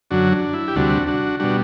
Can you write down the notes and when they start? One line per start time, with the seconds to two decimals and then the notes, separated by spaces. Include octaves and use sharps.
0.11 F#2 D3 F#3 D4 F#4
0.32 D4
0.53 E4
0.68 G4
0.76 D2 C3 G3 D4 F#4
1.07 D4 F#4
1.40 B2 G3 D4 F#4